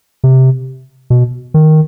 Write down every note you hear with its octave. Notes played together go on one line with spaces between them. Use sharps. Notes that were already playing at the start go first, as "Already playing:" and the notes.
C3
B2
D#3